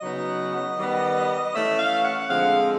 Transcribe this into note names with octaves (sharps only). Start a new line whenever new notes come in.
C#3 F#3 B3 D#4 D#5
D#3 G3 B3
E3 A3 C#4 E5
F5
F#5
D3 F3 G#3 C4 F5